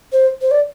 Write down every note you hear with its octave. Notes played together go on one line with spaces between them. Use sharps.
C5
C5
D5